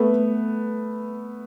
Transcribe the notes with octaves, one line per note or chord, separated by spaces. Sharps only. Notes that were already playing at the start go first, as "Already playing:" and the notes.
Already playing: A3 B3